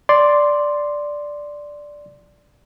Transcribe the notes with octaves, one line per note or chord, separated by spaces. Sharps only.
D5 C6